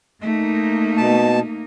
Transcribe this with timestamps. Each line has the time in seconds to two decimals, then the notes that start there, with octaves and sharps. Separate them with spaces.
0.21 A3 A#3 D#4
0.97 B2 A5